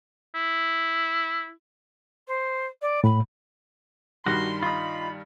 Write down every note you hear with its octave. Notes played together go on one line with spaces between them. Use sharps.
E4
C5
D5
A2 B5
G2 D#3 G3 F#4 C6
D#4 F4 B5